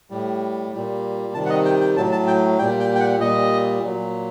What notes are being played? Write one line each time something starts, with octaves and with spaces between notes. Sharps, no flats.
A2 G3
A#2 G3
C3 D#3 G3 A5
F#5
D#5
G5
G5
A2 F#3 A5
A5
G5
A#2 G3 G5
G5
G5
F#5
A#2 G3 D#5
A#2 F#3